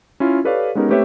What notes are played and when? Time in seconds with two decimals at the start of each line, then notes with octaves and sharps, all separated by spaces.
0.20 C#4 E4 F4
0.44 G4 A4 B4 C#5 D5 F5
0.75 G#3 B3 C#4 D#4 G4 A#4
0.90 A3 C4 G4 B4 C#5 E5